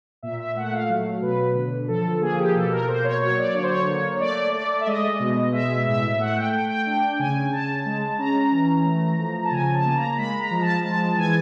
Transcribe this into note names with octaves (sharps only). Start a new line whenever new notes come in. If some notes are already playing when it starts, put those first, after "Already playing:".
A#2 E5
E5
A3 F#5
F5
F#3
B2 B4
D3
F3 A4
A#3 G#4
G4
B2 A4
A#4
A#3 C5
C#5
F#3 C#5
D5
D3 C#5
C5
C#5
A#3
A3 D5
A3 D5
E5
G#3 D#5
B2
G#3 E5
A2 E5
A3 F#5
G5
A3 G5
G5
D4 G5
C#3 G#5
C#3 A5
G#3
C#4 A#5
E3
A3
F3
A5
C#3 G#5
A5
A#3
A#5
G#3 B5
A#5
F3
A5
G#3 A5
E3 G#5